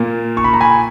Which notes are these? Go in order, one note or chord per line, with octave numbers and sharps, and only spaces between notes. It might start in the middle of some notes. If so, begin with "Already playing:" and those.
Already playing: A#2 A#3
C#6
B5
A#5
G#5 B5